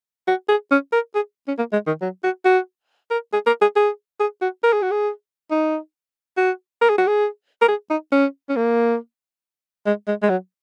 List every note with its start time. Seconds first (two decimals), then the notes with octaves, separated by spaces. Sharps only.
0.28 F#4
0.48 G#4
0.71 C#4
0.92 A#4
1.15 G#4
1.48 C#4
1.58 A#3
1.72 G#3
1.87 D#3
2.01 F#3
2.23 F#4
2.45 F#4
3.10 A#4
3.33 G#4
3.46 A#4
3.61 G#4
3.76 G#4
4.20 G#4
4.41 F#4
4.63 A#4
4.73 G#4
4.82 F#4
4.91 G#4
5.51 D#4
6.37 F#4
6.81 A#4
6.90 G#4
6.98 F#4
7.07 G#4
7.61 A#4
7.68 G#4
7.90 D#4
8.12 C#4
8.49 C#4
8.56 A#3
9.86 G#3
10.07 G#3
10.22 G#3
10.29 F#3